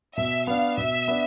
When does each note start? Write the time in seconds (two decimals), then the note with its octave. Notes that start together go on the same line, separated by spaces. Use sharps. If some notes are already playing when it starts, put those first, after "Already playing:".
0.18 B2 E5
0.47 B3 D4 F5
0.78 B2 E5
1.08 B3 D4